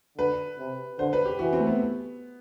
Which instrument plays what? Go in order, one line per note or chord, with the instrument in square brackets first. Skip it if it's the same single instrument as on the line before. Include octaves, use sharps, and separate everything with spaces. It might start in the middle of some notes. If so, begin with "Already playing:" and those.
[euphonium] D3 [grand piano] B4
[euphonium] C3
[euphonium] D3 [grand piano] C5
[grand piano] B4
G4
[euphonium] E3 [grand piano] F#4
[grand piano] C4
A3
B3